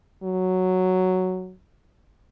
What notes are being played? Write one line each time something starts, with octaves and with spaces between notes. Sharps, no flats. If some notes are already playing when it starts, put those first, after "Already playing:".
F#3